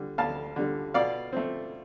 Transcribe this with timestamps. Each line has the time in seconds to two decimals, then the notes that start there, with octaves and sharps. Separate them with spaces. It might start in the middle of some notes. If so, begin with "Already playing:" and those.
Already playing: D3 G3
0.18 D2 F5 A5
0.56 D3 G3
0.94 B2 D5 F5
1.33 A3 C4